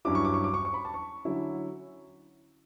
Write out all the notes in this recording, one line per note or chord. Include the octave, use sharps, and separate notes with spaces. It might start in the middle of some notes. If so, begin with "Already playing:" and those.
G2 F#3 C#4 E4 D6
C#6
D6
C#6
D6
C#6
C#6
B5
A5
C#6
D3 F#3 C#4 E4